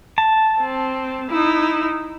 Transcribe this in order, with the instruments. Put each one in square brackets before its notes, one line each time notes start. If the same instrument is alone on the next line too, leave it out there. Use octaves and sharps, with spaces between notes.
[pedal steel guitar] A5
[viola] C4
D#4 E4